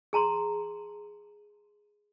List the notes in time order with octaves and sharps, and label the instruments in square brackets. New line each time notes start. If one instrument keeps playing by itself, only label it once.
[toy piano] G#4 A5 A#5 C6